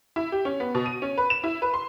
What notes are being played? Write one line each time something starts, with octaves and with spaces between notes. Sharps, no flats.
E4
G4
C#4
B3
B2
D#7
C#4
B4
E7
E4
B4
C6